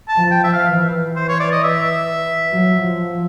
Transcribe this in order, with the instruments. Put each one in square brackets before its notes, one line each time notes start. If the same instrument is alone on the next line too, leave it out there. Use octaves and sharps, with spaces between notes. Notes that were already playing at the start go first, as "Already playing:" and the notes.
[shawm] A5
[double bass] F3
[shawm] G5
[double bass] F3 [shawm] E5
[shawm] F5
[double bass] E3
[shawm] C5
C#5
D5
D#5
E5
[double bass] F#3
F3